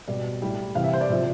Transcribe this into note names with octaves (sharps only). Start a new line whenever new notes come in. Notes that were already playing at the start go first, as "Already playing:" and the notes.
B2 G3 D5
A2 G3
C3 E3 G3 F5
E5
C5
D5
C3 F3 E5